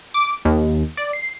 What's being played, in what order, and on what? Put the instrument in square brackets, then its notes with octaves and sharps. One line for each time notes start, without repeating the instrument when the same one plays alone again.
[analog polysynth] D6
D#2
D5
C7